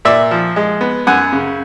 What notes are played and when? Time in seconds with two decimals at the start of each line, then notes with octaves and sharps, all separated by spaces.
0.05 A#2 D5 E5
0.31 F3
0.56 G#3
0.81 B3
1.07 F#2 F#5 G#5
1.33 C#3